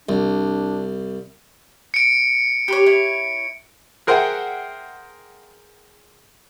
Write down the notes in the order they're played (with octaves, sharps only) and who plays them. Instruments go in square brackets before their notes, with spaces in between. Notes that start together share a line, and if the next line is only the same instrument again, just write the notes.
[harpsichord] C2 [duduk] D4
[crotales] C#7 D7
[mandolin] G4 B4 C#5
E4 C#5
[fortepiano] G#4 A#4 C5 E5 F#5 G5